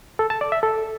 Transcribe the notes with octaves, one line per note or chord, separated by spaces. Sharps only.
A4
A5
D5
E5
A4